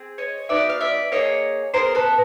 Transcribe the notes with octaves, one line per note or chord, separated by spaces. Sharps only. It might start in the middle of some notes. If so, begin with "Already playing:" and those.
Already playing: C4 G#4
C#5 D#5
B3 D#4 F#4 D5 E5
F5
D5 E5
A#3 D#4 G#4 C#5 D#5
B3 E4 G#4 A#4 C5
A4 B4